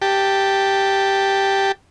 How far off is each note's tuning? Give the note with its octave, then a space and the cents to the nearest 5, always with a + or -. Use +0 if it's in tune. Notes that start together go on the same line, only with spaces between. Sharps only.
G4 +0 A5 +10